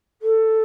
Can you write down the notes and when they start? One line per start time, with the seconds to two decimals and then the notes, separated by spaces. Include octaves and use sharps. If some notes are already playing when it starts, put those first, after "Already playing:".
0.22 A4